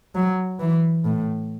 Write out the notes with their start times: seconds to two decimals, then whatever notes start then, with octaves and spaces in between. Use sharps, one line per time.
0.15 F#3
0.60 E3
1.05 A2